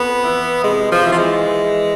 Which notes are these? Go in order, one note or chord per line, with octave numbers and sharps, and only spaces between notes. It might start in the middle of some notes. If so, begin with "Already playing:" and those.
Already playing: F2 B3
E3
C3 G#3
F3
E3
F3
G#3
E3